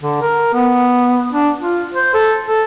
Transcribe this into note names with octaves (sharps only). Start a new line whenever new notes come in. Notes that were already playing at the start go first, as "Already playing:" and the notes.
D3
A#4
B3
D4
F4
C5
A4
A4